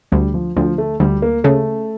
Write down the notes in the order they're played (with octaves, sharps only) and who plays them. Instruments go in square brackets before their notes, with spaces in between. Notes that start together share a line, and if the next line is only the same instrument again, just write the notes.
[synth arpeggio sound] D2 [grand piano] G3
[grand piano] F3
[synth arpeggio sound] D2 [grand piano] F3
[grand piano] A3
[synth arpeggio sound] D2 [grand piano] G3
[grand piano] A#3
[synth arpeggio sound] C#3 [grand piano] A3